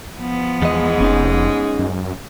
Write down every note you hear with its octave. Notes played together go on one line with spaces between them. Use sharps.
F3 B3
E2 G#2 G#3 D#5
F1 C#4 D#4
F#2